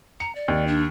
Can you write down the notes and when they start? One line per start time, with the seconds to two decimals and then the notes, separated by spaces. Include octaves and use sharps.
0.20 A#5 C#7
0.35 D5
0.48 D#2
0.68 D4